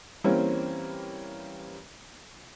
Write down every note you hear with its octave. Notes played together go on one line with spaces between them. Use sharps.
E3 G3 A#3 C4 C#4